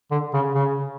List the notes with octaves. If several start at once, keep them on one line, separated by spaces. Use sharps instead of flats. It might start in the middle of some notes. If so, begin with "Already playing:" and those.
D3
C#3
C#3